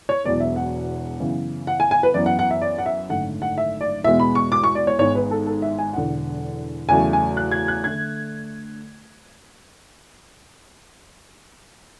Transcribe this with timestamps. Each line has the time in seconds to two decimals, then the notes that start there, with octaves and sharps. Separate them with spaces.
0.09 C#5
0.24 E1 E2 B2 F#3 B3 D5
0.40 E5
0.56 F#5
1.20 F#2 C#3 E3 B3
1.67 F#5
1.80 G#5
1.91 G#5
2.03 B4
2.14 F#2 E3 B3 D5
2.26 F#5
2.39 F#5
2.51 E5
2.62 D5
2.78 F#5
2.86 E5
3.09 G#1 F#2 D3 A3 F#5
3.42 F#5
3.58 E5
3.81 D5
4.04 E2 B2 G#3 B3 E5
4.20 B5
4.35 C#6
4.52 D6
4.64 C#6
4.75 D5
4.87 C#5
4.99 G#1 G#2 G#3 B3 C#5
5.15 B4
5.31 A4
5.46 A4
5.62 E5
5.79 G#5
5.93 E1 E2 D3 F#5
6.89 E2 C#3 F#3 A3 G#5
7.13 G#5
7.37 F#6
7.51 G#6
7.68 F#6
7.84 D3 A3 G#6